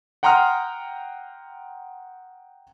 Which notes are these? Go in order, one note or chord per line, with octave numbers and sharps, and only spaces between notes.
F#5 G5 A#5 C6 D#6 F6